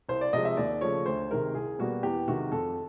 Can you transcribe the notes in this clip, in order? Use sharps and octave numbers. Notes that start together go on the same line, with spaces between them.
C2 C5
D5
C3 F3 G#3 D#5
E5
D#2 D5
C#3 F3 A3 C#5
D2 C5
C3 D#3 G#3 A#4
C2 G#4
B2 G3 A#3 F#4
E2 G4
C3 D#3 G#3 F#4
F2 A4